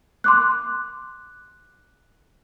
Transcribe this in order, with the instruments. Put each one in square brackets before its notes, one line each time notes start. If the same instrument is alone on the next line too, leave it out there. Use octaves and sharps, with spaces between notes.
[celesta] C6 D6 F#6